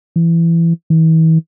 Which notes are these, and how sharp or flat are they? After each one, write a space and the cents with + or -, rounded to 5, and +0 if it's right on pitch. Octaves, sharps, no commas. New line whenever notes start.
E3 +20
E3 -40